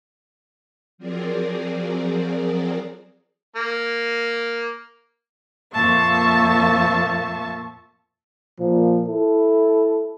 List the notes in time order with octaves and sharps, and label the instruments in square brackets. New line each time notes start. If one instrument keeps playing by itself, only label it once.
[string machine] F3 F#3 C4 G#4 A#4 D5
[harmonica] A#3
[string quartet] F2 A#2 A#3 E5 A5 C#6
[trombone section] A#2 F3
E4 A4